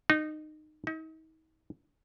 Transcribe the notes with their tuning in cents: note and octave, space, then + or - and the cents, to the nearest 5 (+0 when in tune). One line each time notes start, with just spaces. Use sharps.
D#4 -20
D#4 +40